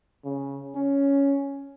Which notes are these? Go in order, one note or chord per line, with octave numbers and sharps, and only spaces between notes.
C#3
C#4